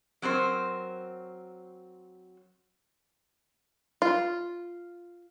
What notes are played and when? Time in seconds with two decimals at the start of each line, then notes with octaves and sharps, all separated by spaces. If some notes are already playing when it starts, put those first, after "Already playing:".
0.22 F#3 C4 A#4 C5
4.02 F4